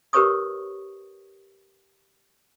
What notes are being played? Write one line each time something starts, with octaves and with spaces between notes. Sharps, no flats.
G4 A#4 B4 C#5 C#6 D#6